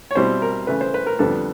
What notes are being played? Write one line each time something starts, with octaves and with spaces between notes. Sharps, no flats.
C#5
B2 G3 C4 E4 C5
A#4
C#3 E3 A3 B4
C5
B4
A#4
F2 D3 G3 B3 A4